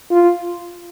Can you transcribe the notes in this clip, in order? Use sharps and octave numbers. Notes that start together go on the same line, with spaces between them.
F4